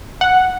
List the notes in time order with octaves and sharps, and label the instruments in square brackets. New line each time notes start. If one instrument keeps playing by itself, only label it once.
[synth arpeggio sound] F#5